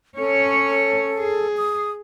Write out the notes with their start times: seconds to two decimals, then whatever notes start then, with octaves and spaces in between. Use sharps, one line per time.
0.18 C#4 A4 C#5
1.18 G#4
1.57 D#6